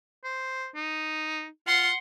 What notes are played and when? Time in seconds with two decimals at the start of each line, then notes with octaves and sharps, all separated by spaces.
0.24 C5
0.76 D#4
1.67 F4 F#5 C6